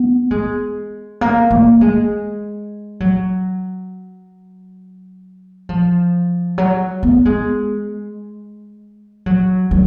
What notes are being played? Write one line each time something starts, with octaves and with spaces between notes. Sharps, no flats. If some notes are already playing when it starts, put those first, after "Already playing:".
Already playing: B3
G#3
A#3
A#3
G#3
F#3
F3
F#3
B3
G#3
F#3
F#3